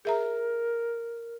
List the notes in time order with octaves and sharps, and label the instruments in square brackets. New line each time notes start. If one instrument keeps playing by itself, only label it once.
[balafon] G#4 E5 A#5 [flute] A#4